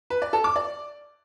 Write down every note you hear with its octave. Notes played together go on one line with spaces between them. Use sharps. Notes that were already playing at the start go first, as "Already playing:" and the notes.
B4
D5
A4
D6
D5